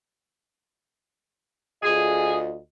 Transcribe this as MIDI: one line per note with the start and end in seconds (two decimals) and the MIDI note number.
1.83 2.57 38
1.83 2.57 65
1.83 2.35 68
1.83 2.57 75